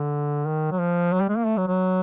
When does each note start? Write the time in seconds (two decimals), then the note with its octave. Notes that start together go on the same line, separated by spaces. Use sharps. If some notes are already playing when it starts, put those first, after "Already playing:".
Already playing: D3
0.47 D#3
0.72 F#3
0.79 F3
1.13 F#3
1.21 G3
1.29 G#3
1.37 A#3
1.46 A3
1.57 F#3
1.68 F#3